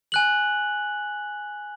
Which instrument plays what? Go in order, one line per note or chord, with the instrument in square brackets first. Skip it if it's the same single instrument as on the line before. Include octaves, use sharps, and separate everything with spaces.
[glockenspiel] G#5 F#6 F#7